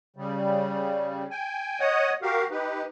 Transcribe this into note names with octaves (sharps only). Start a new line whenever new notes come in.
C#3 G3
G5 G#5
C#5 D#5 F#5 D#6
F#4 G4 A#4 F5
D#4 G4 B4